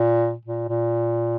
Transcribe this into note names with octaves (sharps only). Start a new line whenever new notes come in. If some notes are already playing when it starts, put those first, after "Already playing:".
Already playing: A#2
A#2
A#2